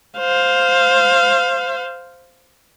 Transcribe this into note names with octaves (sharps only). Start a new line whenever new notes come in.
C5 F5